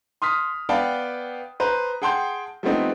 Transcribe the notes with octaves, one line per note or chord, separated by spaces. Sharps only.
C6 D#6 F6 B6
B3 D5 F5 G5 A5 B5
B4 C5 A#5
G#4 F#5 G5 A5 C6 G6
F3 G3 A3 B3 C4 D#4